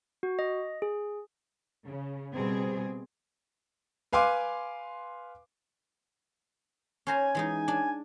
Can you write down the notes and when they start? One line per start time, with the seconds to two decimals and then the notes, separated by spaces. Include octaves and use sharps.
0.23 F#4
0.39 D#5
0.82 G#4
1.87 C#3
2.35 B2 G3 C4 G#4
4.13 B4 F5 G#5 C6 D6
7.07 C#4 C5 G#5 A#5
7.35 E3 G#3 D#4
7.68 D4